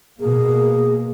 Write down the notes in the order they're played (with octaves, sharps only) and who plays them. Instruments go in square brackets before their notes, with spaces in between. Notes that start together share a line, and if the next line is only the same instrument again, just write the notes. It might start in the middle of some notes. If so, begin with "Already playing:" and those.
[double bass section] B2 A#3 [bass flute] G#4